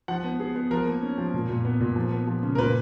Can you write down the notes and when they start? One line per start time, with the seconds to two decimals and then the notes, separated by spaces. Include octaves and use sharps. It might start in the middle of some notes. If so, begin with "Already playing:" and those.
0.08 F3 F#5
0.24 B3
0.40 B3 G#4
0.55 B3
0.71 F3 A#4
0.87 A#3
1.02 C#4
1.18 F3
1.34 A#2
1.49 A#2
1.65 B3
1.80 A#2
1.96 F3
2.12 B3
2.27 F3
2.43 C#3
2.55 A#4
2.58 A#2 B4